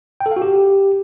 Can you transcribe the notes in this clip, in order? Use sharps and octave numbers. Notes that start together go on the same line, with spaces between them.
G5
A4
F5
F#4
G4